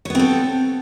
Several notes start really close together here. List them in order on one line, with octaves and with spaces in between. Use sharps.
C#5 B3 C4 A4